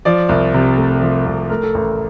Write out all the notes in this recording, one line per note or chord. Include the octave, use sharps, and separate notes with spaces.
F3 D5
C2
C3
A3
F3
C2
A3 A#4
A4
A1 A#4